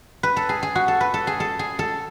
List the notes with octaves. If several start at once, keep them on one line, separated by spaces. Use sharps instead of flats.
B4
A4
G#4
G#4
F#4
A4
B4
A4
G#4
A4
G#4
A4